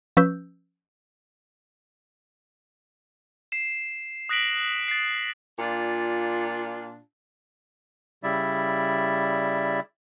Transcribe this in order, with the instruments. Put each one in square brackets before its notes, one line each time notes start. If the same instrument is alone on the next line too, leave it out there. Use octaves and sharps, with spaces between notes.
[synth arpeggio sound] F3 C#4 B4 E6 G6
[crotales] C7 E7
D#6 F#6 A#6 B6 D7 F#7
A6 C7
[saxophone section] A#2 D4 F4
[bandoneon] C#3 G3 E4 D5 E5